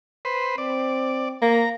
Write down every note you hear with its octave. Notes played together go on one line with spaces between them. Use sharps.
B4 C5
C4 D5
A#3 A#5